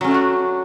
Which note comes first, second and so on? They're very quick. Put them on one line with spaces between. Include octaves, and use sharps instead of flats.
F#3 C#4 A3 D4 F#4